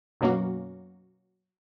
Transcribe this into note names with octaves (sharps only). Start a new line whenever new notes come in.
F#2 B2 F#3 A#3 C#4 F#4